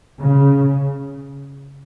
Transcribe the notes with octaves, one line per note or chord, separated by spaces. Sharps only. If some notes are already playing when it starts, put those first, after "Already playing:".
C#3